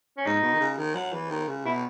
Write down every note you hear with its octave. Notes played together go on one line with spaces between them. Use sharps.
C#4
G#2 D#4
B2
D#3
C#3
D#3
F#3
E3
D#3
C#3
B2 E4